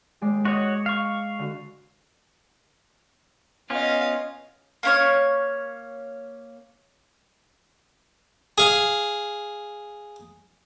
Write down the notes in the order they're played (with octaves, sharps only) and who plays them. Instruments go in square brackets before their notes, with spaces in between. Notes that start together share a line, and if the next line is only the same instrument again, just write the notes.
[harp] D#2 G#3 D5
[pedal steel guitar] F#4 C#5 [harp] D#5 D6 D#6
[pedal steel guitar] F5 C#6
[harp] D3 F#4
[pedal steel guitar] B3 C#4 F4 [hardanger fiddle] D#5 F5
[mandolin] A#3 C#4 C#5
[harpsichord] G#4 F5